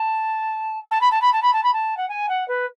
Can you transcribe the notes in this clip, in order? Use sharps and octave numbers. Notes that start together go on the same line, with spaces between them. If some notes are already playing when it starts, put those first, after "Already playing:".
Already playing: A5
A5
B5
A5
B5
A5
B5
A5
B5
A5
F#5
G#5
F#5
B4